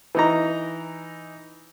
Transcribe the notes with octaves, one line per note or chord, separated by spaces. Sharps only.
E3 D#4 A#5